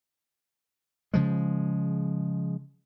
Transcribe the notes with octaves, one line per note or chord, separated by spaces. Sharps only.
C#3 F3 G#3